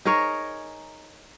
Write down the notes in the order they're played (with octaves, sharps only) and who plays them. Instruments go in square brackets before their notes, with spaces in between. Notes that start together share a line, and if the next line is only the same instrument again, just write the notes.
[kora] D#4 G#4 A#4 C#5